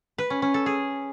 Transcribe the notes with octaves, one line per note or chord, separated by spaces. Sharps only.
B4
C#4
C#4
A4
G#4